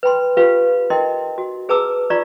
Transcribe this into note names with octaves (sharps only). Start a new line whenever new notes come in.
B4 G5 B5 C6
F4 G4 B4 F5
D#4 E4 A#4 D#5 G5 C6
F#4
G#4 B4 A5 A#5 D6 E6
D#4 F4 D5 A#5 C#6